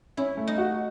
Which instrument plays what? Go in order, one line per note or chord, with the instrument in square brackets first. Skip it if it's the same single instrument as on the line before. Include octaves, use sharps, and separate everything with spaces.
[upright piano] C#4 [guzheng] E4
[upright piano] A3
[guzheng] D#4
[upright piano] F#4